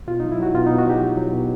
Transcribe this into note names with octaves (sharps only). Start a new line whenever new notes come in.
B2 F4
F#3 D#4
E4
F#3 F#4
B2 F4
B2 D#4
F#4
F#3 G4
F#3
F#3
B2